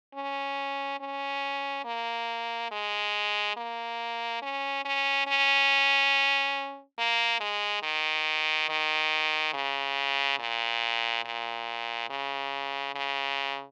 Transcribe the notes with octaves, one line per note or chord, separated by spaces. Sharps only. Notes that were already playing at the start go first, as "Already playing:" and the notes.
C#4
C#4
A#3
G#3
A#3
C#4
C#4
C#4
A#3
G#3
D#3
D#3
C#3
A#2
A#2
C#3
C#3